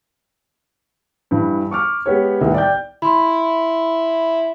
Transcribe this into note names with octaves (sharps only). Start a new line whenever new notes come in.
G2 E3
C#6 D6 F6
G#3 B3 G4 C#5
C2 A2 D#3 B3
D5 G5 G6
E4 B5 C6